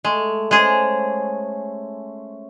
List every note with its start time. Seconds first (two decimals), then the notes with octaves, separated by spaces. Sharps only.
0.04 G#3 A3
0.51 G#3 C#4 G#4 C5